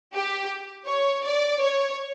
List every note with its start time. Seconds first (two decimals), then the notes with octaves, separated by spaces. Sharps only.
0.14 G4
0.86 C#5
1.24 D5
1.60 C#5